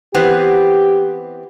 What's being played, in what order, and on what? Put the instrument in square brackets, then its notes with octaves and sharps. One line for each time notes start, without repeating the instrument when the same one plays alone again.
[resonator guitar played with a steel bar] E3 B3 C4 [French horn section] G4